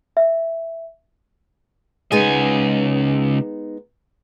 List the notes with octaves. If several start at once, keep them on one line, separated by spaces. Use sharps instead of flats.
E5
C#2 G#3 B3 D#4 G#5